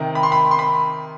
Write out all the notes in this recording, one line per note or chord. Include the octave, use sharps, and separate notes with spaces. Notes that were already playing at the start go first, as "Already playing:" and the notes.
Already playing: C3 D#3
B5
C6
B5
C6
B5